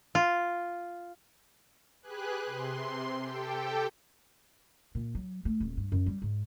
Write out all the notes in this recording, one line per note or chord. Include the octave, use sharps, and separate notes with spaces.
F4
G4 G#4 B4 G#5 F#6
C3 C6
G4 A4 G5
A#2
F#3
A3
D#1
G2
F#2
G3
G#2